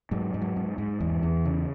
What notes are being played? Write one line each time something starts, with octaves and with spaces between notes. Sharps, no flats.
G#2 F#3
G#2
F#3
G#2
G#2
E2 E3
E2
C#3